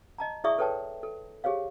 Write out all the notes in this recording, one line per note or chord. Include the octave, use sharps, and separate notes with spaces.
D#5 A5 A#5
E4 G#4 D5 E5 C#6 D#6
A4 B4 C#5 G5 A5
A4
G4 G#4 C5 C#5 F5